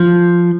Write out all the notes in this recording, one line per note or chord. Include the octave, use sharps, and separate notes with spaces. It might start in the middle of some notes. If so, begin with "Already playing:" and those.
Already playing: F3